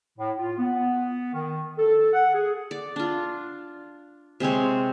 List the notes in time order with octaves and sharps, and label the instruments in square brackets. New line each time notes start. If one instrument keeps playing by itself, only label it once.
[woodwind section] A2
F4
B3
D#3
A4
F#5
G#4
[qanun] D5
D4 F4
C3 G#3 C4 C#5